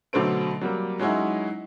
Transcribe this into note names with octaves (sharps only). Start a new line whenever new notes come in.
B2 D3 F#3 A3 C5 D7
F#3 G3 A#3
F#3 G#3 C#4 D#4 E4 F#4